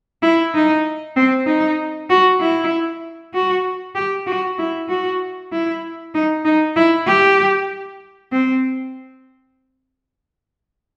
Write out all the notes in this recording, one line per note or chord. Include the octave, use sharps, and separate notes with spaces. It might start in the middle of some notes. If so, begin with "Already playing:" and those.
E4
D#4
C4
D#4
F#4
E4
F#4
G4
F#4
E4
F#4
E4
D#4
D#4
E4
G4
C4